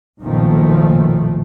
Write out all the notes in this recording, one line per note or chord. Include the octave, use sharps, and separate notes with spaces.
F#1 B1 A#2 D#3 F3 A3